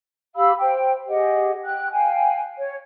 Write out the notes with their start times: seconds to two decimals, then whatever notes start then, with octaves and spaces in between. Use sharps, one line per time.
0.36 G4 F5 B5 E6
0.59 C5 G5
1.08 G4 G#4 D#5 F#5
1.65 G5 F#6
1.91 F5 G5 G#5
2.57 C#5